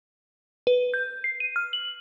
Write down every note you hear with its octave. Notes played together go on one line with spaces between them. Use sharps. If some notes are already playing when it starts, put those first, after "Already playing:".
B4
G6
C7
D#7
F6
F#7